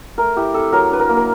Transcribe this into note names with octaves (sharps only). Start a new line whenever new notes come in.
A3 A#4
E4 G4
C4 A4
F#3 A#4
D4 B4
A#4
A#3
A#4